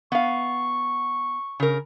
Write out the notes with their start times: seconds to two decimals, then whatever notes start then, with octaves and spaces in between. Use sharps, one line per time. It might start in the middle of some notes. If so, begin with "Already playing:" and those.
0.12 B3 F5 C#6
1.60 C#3 A#4